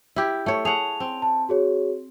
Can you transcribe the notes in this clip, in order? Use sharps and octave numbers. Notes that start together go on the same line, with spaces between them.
E4 G4
A3 C#5
G#4 C#5 F#5 A5 F7
C4
A5
F#4 G#4 C#5